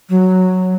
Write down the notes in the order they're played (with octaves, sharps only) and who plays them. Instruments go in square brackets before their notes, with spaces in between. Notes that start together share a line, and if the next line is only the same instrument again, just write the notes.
[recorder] F#3